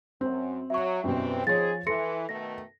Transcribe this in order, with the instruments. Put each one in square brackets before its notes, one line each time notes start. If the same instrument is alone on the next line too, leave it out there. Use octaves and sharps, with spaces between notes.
[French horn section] F#2 [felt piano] C4
[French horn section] F#3 [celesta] E5 C#6
[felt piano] F#2 B2 [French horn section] E3 G3 C4
[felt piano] F3 C#5 [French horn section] C4 D#4 G#4 [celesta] A6
[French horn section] E3 [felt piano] A4 [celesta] C6 A#6 C#7
[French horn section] B2 D#3 A3 [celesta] A#6